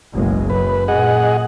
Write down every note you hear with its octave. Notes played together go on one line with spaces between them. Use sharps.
F#1 B1 G#3
F#2 B4
A#2 G#4 D#5 F#5